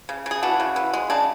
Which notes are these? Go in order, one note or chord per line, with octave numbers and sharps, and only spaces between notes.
C#3
C#3
G#4
E3 D4 F#4
C#3
E3
G#3
C#3 D4